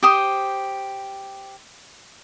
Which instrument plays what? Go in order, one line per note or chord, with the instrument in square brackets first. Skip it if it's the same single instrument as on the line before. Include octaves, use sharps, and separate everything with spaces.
[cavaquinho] G4 C5 D#6